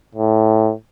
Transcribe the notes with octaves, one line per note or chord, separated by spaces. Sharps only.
A2